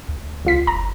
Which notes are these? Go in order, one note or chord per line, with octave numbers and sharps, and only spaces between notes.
D2
C#2 F4 B6
F#1 A#5